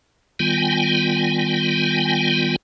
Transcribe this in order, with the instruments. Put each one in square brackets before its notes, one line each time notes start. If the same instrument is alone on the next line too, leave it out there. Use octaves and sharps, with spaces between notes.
[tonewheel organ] D#3 G3 B3 F4 G5 G#5